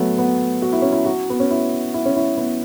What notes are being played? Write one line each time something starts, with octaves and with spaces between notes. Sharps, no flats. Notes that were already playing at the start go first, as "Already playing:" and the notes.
Already playing: F#3 A3 B3
B3
F#4
E4
C#4
E4
F#4
B3
C#4
E4
E4
C#4
E4
B3